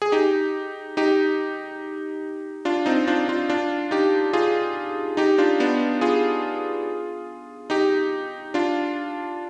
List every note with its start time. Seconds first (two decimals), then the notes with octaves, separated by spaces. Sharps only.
0.02 G#4
0.12 D#4 G4
0.97 D#4 G4
2.65 D4 F4
2.86 C4 D#4
3.07 D4 F4
3.28 D4 F4
3.49 D4 F4
3.91 D#4 G4
4.33 F4 G#4
5.17 D#4 G4
5.38 D4 F4
5.60 B3 D4
6.01 F4 G#4
7.70 D#4 G4
8.54 D4 F4